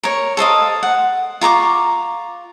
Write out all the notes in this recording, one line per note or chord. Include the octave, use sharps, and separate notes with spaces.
A#4 C#5
A4 C5 D#5 F5
F#5
F4 A#5 C#6 D6